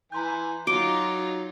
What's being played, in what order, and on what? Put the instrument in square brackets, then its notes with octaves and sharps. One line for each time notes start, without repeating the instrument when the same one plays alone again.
[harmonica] E3 G#5 [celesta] A#5 C6 G6
[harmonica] F#3 [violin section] D#4 F4 [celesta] F#4 G7 [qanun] D6